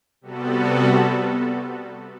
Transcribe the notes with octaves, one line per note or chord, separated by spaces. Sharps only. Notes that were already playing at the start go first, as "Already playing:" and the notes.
C3 G3 B3 F#4 A4